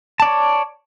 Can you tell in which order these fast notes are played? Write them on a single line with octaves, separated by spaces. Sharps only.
A5 D5 C#5